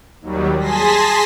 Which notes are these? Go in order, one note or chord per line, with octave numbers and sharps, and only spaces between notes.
D#2 F#3 G3
G#4 G#5 A5 C6 A#6 B6